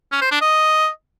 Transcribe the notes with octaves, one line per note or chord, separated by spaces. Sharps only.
C#4
C5
D4
D#5